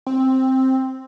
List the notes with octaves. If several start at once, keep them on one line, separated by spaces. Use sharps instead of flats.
C4